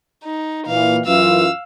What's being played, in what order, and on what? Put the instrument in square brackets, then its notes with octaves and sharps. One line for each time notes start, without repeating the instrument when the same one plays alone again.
[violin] D#4
[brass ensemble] A#2 E3 [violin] F5
[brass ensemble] F#2 E3 F4 [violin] F5 E6